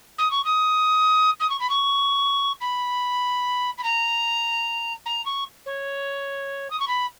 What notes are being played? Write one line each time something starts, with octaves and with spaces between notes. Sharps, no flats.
D#6
C#6
D#6
D#6
C#6
B5
C#6
B5
B5
A#5
A#5
C#6
C#5
D#6
C#6
B5